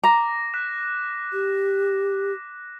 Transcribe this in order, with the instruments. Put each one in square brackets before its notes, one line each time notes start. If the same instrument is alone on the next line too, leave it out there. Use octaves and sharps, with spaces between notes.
[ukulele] A#5 [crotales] D6 A#6
[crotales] F#6 B6 E7
[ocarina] G4